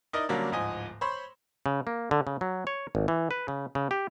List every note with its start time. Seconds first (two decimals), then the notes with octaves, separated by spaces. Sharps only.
0.13 D#4 E4 A#4 D5 D#5
0.29 D3 F#3 G3 A#3 C#4 D4
0.52 D1 G#2 F3 D#5 G#5
1.01 C5 C#5 B5 C6
1.66 C#3
1.87 A#3
2.11 D3
2.27 C#3
2.41 F#3
2.67 C#5
2.95 G#1
3.08 E3
3.31 B4
3.48 C#3
3.75 C#3
3.91 G4